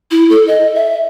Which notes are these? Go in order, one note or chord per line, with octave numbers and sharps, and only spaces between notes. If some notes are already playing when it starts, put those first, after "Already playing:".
E4
A4
D#5
E5